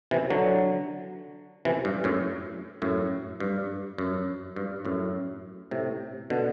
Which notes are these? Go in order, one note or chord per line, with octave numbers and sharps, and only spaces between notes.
C3 E3
D3 F#3
C3 E3
G2
F#2 A2
F#2 A2
G2
F#2
G2
F#2 A2
A2 C3
B2 D3